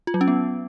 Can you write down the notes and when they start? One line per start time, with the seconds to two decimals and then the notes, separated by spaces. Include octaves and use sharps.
0.07 F4
0.14 F#3
0.21 C#4
0.28 B3